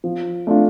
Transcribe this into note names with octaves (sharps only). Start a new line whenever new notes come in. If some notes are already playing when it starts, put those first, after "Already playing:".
F3
A3 D4 F4